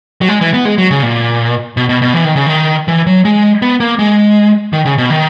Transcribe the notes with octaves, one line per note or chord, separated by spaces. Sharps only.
F#3
G#3
E3
B3
G#3
F#3
C#3
A#2
B2
B2
B2
E3
D#3
C#3
D#3
E3
F#3
G#3
B3
A#3
G#3
D#3
C#3
B2
D#3